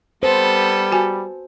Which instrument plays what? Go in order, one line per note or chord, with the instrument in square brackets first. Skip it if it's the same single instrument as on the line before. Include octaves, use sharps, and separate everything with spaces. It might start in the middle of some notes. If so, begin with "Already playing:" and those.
[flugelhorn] G3 [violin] B3 A4 [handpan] C5
[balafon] F#4 G#5